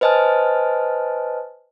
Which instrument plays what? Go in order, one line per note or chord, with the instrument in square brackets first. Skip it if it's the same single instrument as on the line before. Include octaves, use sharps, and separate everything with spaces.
[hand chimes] B4 C5 D#5 G#5 A5 F6